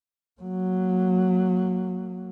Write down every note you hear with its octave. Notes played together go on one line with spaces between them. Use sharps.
F#3 A#3